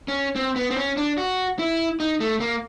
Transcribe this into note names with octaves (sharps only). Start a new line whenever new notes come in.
C#4
C4
B3
C4
C#4
D4
F#4
E4
D#4
A3
A#3